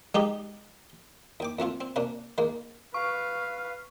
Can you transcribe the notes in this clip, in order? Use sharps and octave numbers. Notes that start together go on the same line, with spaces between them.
G#3 D#4 G4
D#2 G5 D6
F2 A3 C4 F4
C4
C3 A#3 C#4 D4
D#3 G#3 A#3
B4 F5 C#6